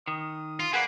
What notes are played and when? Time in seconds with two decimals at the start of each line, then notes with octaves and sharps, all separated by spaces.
0.07 D#3 D#6
0.60 F4
0.73 A#3 G#4 B4 D5 F#5